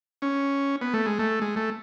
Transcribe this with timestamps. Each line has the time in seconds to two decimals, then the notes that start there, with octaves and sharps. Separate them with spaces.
0.22 C#4
0.82 B3
0.94 A3
1.06 G#3
1.19 A3
1.42 G#3
1.56 A3